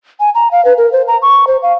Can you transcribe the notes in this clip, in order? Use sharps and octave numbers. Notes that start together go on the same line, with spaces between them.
G#5
A#5
F5
B4
A#4
C5
A#5
C#6
C5
F5